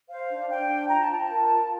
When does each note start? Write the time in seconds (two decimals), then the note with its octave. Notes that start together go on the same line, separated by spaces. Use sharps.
0.09 C5 F5
0.30 D4
0.49 D4 G5
0.69 C5
0.89 F4 A#5
1.01 A5
1.10 F4 G5
1.22 A5
1.29 A#4
1.49 F4